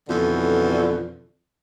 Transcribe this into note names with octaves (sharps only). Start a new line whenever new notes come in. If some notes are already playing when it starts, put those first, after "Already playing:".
F2 B2 D3 E3